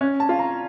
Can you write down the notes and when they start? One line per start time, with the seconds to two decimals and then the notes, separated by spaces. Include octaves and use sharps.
0.01 C#4
0.20 A5
0.29 F4
0.39 A#5